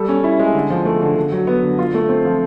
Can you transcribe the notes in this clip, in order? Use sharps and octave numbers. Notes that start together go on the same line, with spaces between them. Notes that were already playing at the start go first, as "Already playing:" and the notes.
Already playing: G3 A4
C#4
E4
G#3
D3
F3
A3
D3
D3
F#3
B3
D3
F4
A3
C4
F3